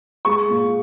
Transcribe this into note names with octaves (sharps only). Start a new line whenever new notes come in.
G#3 C#6
A#2